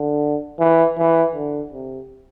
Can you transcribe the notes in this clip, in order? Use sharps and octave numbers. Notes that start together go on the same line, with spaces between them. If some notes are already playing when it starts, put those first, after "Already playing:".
Already playing: D3
E3
E3
D3
C3